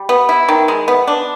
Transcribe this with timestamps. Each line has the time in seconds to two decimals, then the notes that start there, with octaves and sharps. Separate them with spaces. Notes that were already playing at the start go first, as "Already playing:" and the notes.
Already playing: G3
0.09 B3
0.29 E4
0.49 D#3
0.68 G#3
0.88 B3
1.07 D4